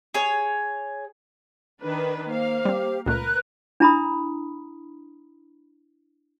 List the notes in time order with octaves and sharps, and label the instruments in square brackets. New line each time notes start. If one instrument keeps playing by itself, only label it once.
[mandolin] G#4 C#5
[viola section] D#3 D4 B4
[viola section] A#3 F5 [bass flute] C5
[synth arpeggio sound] G3 C4 [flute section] G4
[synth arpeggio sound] C#2 A#2 A3 [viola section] A#4 B4 [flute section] F#6
[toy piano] D4 E4 A#5 B5 D#6